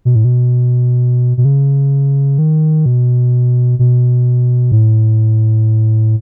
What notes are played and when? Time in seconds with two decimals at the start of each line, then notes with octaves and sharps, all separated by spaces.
0.05 B2
0.16 A2
0.25 B2
1.37 B2
1.45 C#3
2.39 D#3
2.86 B2
3.79 B2
4.72 A2